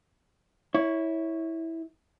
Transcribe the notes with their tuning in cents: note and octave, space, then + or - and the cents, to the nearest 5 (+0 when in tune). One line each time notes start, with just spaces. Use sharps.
E4 -15 C#5 +5